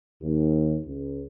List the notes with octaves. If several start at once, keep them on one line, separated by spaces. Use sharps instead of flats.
D#2
C#2